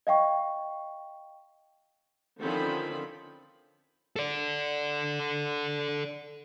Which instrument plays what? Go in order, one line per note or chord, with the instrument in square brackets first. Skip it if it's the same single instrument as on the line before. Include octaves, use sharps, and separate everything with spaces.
[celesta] D#5 F5 G5 C#6
[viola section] D3 D#3 F3 C4 C#4 B5
[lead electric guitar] A4 D5